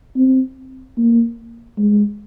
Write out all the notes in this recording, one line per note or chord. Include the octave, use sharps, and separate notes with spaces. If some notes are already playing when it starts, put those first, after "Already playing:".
C4
A#3
G#3